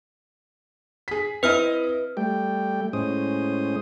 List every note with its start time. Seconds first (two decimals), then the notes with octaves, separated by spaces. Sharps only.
1.08 G#4 B6
1.43 C4 E4 B4 D#5 F6
2.17 G3 A3 G5
2.93 A2 G#3 C#4 C5 D#6